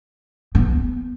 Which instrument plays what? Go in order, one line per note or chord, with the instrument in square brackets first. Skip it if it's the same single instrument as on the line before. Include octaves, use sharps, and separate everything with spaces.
[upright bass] B3